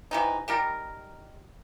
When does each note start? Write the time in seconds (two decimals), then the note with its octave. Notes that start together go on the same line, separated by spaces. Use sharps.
0.11 C3 E3 D#4
0.48 D#3 G3 A#4